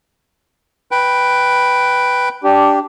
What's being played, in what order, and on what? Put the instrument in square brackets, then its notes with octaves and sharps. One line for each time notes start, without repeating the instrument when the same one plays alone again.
[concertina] B4 G5
[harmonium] D4 G4